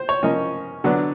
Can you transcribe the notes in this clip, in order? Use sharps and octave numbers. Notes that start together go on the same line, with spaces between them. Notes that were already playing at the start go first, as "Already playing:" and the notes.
Already playing: C5
C#5
F3 A#3 C#4 D#5
D3 F#3 B3 D4